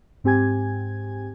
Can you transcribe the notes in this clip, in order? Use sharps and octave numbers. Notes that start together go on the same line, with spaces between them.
G#2 C4 G4 G#5 G#6